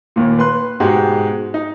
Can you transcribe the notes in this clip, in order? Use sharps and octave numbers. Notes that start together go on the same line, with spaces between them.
D#2 A#2
B4 C6 F#6
G#2 B2 G#3 F#4 G4
D#4